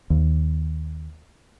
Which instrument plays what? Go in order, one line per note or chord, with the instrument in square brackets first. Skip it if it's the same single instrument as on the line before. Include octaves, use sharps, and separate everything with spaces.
[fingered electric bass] D#2